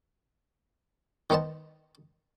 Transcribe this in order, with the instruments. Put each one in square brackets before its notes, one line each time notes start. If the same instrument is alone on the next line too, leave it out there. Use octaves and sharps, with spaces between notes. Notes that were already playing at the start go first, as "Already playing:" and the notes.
[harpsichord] D#3 B3 C5 D#5 A5